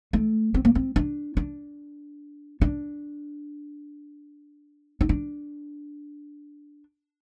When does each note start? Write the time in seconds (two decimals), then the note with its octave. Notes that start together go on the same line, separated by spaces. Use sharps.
0.13 A3
0.54 C4
0.65 A#3
0.75 C4
0.96 D4
1.37 D4
2.61 D4
5.01 D#4
5.09 D4